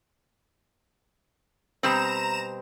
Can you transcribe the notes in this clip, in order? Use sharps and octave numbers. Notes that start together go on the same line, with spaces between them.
B2 G3 C4 A#5 E7